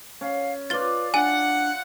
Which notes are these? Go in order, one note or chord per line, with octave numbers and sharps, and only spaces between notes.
C#4 F5
F4 B4 D5 A6 G7
D4 F#5 G#5 D#7